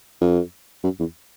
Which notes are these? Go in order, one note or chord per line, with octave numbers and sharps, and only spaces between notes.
F2
F#2
E2